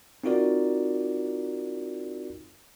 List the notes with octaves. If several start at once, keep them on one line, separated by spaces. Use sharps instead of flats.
C4 D#4 F4 F#4 A#4 D5